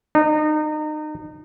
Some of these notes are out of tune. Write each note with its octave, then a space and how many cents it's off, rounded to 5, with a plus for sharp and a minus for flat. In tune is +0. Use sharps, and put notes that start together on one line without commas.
D#4 -30